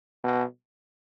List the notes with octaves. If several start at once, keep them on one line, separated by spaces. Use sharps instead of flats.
B2